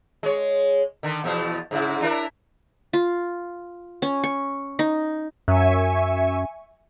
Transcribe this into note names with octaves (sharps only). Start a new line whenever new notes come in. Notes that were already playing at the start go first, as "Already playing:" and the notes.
G#3 C#5
D3 D#3
E2 B2 F3
G#2 C#3 E4
D4 E4 A#4
F4
C#4
C#6
D#4
F#2 E5 G#5 C#6